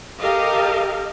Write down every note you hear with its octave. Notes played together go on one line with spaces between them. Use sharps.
G4 A4 A#4 D#5 F5